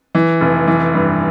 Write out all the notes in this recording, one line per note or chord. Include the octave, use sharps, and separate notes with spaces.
E3
F1
E3
G2